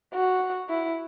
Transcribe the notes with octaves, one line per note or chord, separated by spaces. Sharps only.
F#4
E4